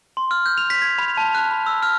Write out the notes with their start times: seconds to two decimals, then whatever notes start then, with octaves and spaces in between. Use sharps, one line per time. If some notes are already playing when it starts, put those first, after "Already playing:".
0.17 C6
0.31 F6
0.46 G6
0.58 F7
0.70 B6
0.82 G#6
0.98 B5
1.17 A5
1.35 F#6
1.51 B5
1.66 E6
1.83 F6